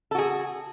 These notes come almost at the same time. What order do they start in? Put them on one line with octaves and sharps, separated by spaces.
A4 F#4 G#4